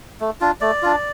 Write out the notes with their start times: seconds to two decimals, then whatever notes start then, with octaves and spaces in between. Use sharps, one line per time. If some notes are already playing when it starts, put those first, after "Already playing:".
0.20 A3
0.41 D4 F4
0.61 A3 D5
0.82 D4 F4